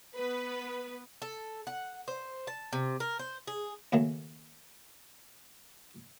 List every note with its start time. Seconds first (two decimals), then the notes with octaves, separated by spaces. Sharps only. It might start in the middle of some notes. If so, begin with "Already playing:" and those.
0.15 B3 B4
1.22 A4
1.67 F#5
2.08 C5
2.47 A5
2.73 C3
3.00 A#4
3.19 C5
3.47 G#4
3.92 D#2 C#3 F#3 A3